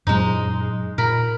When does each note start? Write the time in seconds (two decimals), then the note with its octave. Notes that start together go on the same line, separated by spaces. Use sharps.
0.07 F#2 A#2 F#3 G#3 D#4
0.98 A#2 A#4 B5